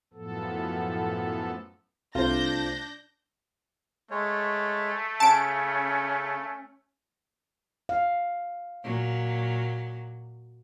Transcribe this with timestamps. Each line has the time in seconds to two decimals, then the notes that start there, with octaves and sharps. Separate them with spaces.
0.14 F#2 A2 F3 B3 A4
2.15 C2 A3 D4 F4 C5 G6 A#6
4.11 G#3 A3 C#5
5.20 C#3 C#4 A5 D7
7.89 F5
8.83 A#2 F#3